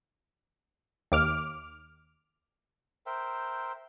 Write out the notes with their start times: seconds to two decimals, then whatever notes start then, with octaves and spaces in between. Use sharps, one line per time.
1.12 D#2 D6 F6
3.06 A#4 C5 E5 G5